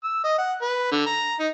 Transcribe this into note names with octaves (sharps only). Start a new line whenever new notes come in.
E6
D#5
F#5
B4
D3
A#5
D#4